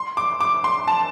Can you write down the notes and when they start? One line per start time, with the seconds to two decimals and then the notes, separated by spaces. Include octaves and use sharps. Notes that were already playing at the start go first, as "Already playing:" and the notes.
Already playing: C6
0.17 D6
0.40 D6
0.64 C6
0.88 A5